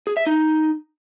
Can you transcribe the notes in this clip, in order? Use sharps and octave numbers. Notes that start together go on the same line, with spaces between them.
G#4
E5
D#4